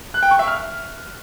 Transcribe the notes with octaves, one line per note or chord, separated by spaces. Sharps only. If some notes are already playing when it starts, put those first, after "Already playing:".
F#6
G5
C#6
E5
F6